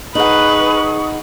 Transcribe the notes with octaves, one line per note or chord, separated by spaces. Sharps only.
D#4 G#4 B4 F#5 C#6 D#6 F#7